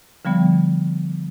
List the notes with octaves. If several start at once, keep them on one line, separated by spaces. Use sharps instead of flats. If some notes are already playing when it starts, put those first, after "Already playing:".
D3 F3 G3 B3